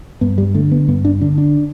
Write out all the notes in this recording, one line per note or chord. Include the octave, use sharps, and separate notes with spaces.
G2 B3
G3
D3 A3
B3
G2 B3
D4
D3 D4
D4